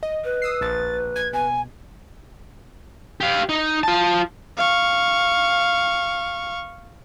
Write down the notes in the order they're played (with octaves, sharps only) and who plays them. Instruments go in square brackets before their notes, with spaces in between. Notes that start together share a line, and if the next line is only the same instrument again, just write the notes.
[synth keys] D#5
[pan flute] B4
[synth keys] D#6 E6 C7
[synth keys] A#1 [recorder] A6
[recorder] G#6
[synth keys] B2 [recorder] G#5
[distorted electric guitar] G4 F5
D#4
F4 A5
[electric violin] F5 C#6